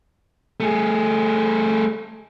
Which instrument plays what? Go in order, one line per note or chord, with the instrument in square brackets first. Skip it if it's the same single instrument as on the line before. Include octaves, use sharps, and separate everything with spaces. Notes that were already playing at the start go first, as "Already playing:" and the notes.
[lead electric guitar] A3 G#4